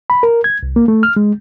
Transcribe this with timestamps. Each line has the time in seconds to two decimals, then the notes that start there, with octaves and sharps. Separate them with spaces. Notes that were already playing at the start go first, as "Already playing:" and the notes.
0.10 B5
0.23 A#4
0.44 G#6
0.63 C2
0.76 A#3
0.88 A3
1.03 F6
1.17 G#3